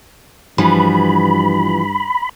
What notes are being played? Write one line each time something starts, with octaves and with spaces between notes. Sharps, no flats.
G2 E3 F3 F#4 B5